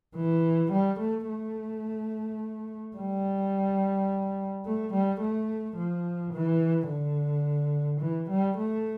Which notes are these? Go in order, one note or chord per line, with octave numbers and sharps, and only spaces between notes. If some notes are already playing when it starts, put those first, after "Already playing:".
E3
G3
A3
A3
G3
A3
G3
A3
F3
E3
D3
E3
G3
A3